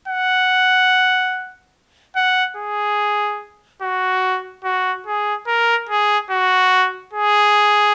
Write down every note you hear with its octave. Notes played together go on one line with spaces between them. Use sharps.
F#5
F#5
G#4
F#4
F#4
G#4
A#4
G#4
F#4
G#4